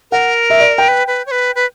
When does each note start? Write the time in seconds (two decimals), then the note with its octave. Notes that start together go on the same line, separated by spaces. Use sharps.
0.11 A#4 F#5
0.50 E5
0.60 D5
0.78 G5
0.88 B4
1.07 B4
1.26 C#5
1.31 B4
1.55 B4